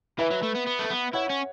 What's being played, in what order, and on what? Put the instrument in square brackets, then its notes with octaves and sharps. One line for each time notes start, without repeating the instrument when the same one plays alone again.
[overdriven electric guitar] E3 [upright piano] B4 E5
[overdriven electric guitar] F#3
A3
B3
B3
A3
B3
[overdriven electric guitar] E4 [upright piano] C#5 F#5
[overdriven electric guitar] C#4